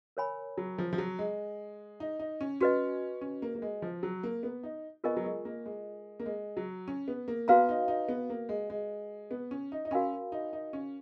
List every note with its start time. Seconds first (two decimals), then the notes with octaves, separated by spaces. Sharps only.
0.17 A#4 C#5 G#5 B5
0.58 F#3
0.78 F3
0.93 F3
0.98 F#3
1.19 G#3
2.00 D#4
2.19 D#4
2.41 C#4
2.60 C#4 F#4 B4 D#5
3.21 C#4
3.42 A#3
3.55 A#3
3.62 G#3
3.82 F3
4.03 F#3
4.23 A#3
4.43 B3
4.63 D#4
5.04 B3 F4 A#4 D#5 G#5 C#6
5.17 F#3
5.24 G#3
5.45 A#3
5.66 G#3
6.20 A#3
6.26 G#3
6.57 F#3
6.88 C#4
7.08 B3
7.28 A#3
7.48 B3 F#4 B4 F5 A#5
7.69 D#4
7.88 D#4
8.09 B3
8.30 A#3
8.49 G#3
8.70 G#3
9.31 B3
9.51 C#4
9.72 D#4
9.85 D#4
9.91 C#4 F#4 A#4 F5 G#5 B5
10.32 D#4
10.53 D#4
10.73 C#4